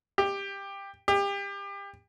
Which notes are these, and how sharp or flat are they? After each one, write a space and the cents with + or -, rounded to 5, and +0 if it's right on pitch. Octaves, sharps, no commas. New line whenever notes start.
G4 +15
G4 +30